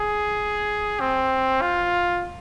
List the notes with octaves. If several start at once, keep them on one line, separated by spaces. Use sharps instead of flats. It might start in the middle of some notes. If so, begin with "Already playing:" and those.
Already playing: G#4
C4
F4